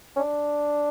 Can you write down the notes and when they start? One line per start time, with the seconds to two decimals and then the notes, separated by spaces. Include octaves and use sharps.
0.16 C#4
0.19 D4